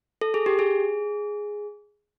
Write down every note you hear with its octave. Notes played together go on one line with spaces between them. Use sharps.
A4
G#4
G4
G#4